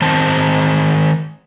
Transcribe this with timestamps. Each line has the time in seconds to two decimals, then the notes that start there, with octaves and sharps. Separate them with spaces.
0.02 D#3 C4 C5 A5